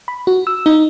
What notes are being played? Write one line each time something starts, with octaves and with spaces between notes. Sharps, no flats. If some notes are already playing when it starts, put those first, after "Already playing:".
B5
F#4
E6
D#4